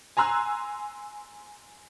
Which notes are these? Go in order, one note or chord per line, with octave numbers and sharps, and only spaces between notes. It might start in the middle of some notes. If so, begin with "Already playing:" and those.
G#5 A#5 C6 E6 F#6